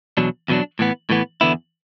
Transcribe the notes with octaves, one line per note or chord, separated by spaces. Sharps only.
E2 B2 F#3 D4
E2 B2 F#3 D4
A2 E3 B3
A2 E3 B3
E2 D3 B3 E4